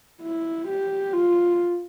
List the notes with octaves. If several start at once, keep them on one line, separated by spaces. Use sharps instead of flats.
E4
G4
F4